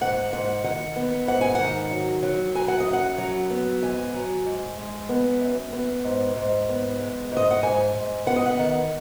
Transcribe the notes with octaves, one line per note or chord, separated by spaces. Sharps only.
G#2 F#5
G#2 F#5
D#3 F#5
B3
G#2 F#5
G#5
D#3 F#5
F#3
F#3
F#3 G#5
F#5
D#5
F#2
F#5
F#3
B3
G#2 G#5
F#3
G#2
G#3
B3
F#2
B3
G#2
G#2
B3
G#3
G#2 D#5
F#5
G#2 G#5
G#2
B3 F#5
D#5
F#5
D#3